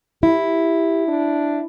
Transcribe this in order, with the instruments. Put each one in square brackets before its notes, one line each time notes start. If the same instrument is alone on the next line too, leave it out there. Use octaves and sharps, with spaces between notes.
[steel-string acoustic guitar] E4 [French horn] G4
[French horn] D4